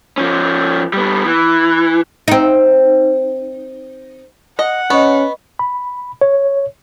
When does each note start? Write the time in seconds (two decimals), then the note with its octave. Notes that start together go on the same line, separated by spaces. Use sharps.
0.18 F3 C#4
0.93 G3 B3
1.26 E3
2.28 C4 D#4
4.59 D#5 F#5
4.90 B3 C#4 D#5 C#6
5.59 B5
6.21 C#5